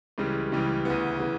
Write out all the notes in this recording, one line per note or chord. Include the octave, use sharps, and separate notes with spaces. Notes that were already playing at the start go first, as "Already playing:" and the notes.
C#2 C#3 E3 G3
C#2 C#3 E3 G3
D2 C#3 E3 B3
C#3 E3 B3